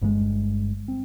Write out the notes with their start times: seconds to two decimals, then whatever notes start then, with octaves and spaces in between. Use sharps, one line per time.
0.01 G1 G2 D3 G#3
0.88 C4